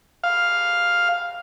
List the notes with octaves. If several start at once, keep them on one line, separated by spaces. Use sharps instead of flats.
F5